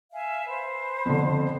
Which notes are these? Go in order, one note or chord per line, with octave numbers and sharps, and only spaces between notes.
E5 F5 G#5
B4 C5
F2 D3